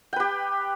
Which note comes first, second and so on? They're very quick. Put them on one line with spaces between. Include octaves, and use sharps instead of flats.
G5 B4 G4